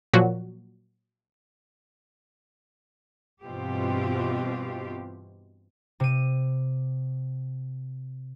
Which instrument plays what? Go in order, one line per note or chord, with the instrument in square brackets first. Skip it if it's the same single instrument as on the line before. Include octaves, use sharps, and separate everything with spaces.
[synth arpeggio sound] A#2 F3 F#3 F#4
[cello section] G2 B2 E3 C4 F4 G4
[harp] C3 D#7